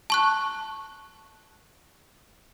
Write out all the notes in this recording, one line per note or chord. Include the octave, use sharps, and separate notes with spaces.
A5 C#6 F#6